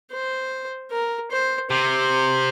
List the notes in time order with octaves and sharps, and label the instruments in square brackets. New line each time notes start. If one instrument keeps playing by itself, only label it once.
[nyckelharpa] C5
A#4
C5
[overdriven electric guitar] C3 [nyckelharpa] C5